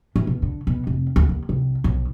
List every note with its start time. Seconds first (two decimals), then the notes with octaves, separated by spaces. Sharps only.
0.16 E3
0.27 B2
0.42 D3
0.67 B2
0.87 F1
1.16 D2
1.29 D#2
1.49 C2
1.84 B1